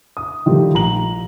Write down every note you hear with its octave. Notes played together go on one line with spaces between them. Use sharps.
D#6
D#3 F3 G3 A3
A#1 A#5 F#7